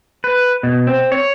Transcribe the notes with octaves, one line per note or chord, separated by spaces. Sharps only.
B4
B2
C4
C#5